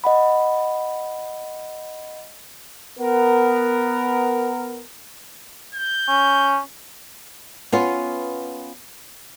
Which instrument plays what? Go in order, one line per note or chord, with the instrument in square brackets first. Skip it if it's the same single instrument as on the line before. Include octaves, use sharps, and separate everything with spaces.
[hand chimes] D#5 F#5 B5
[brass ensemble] B3 A#4
[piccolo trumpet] G6
[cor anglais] C#4
[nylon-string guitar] B3 C#4 F4